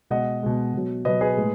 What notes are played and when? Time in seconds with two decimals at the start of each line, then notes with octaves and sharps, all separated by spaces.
0.10 B2 G#3 D#5 F#5
0.43 B2 G#3
0.74 B2 F#3
1.05 B2 F#3 B4 D#5
1.21 G#4 B4
1.37 A2 G#3